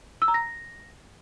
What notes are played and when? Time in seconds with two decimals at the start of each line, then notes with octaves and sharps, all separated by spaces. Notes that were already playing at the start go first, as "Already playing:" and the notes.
0.22 E6
0.28 A#5
0.34 A#6